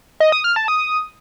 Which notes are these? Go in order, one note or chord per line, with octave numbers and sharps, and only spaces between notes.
D#5
D#6
F6
A5
D#6